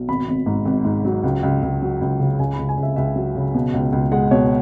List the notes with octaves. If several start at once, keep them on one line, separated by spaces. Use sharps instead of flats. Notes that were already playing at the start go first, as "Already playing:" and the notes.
Already playing: B1
G#1 B5
G#1
G#2
G#1
G#2
F#3
C#2
C#2
C#2
F#3
C#2
C#3
C#2 G#5
B5
C#2
G#5
C#2
E5
C#2 E5
F#3
C#3
B2
C#2
C#2
G#3 F#5
B2 C#5